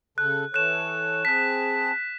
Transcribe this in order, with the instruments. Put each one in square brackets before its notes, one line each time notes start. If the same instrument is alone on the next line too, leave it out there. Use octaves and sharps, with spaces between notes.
[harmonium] C#3 A4 [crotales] F#6
[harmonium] E3 A4 C#5 [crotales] F#6 E7
[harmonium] C4 G#4 A5 [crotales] F#6 B6